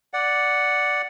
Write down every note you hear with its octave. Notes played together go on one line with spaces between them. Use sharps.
D5 F#5